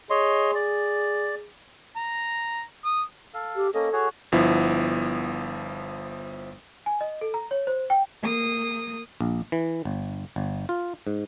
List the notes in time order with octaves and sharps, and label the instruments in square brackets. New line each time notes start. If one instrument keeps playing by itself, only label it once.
[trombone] G#4 [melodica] C#5 D#5 C6
[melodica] D5
[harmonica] A#5
D#6
[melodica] A4 F5
[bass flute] G4
[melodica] A#3 C#4 D#5 [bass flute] A4
[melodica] F#4 G#4 C#5
[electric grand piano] G1 F3 B3 E4
[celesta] G#5
D#5
A4
A#5
C#5
C5
G5
[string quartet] A#3 D#6
[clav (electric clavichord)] A#1
E3
G1
G1
F4
G#2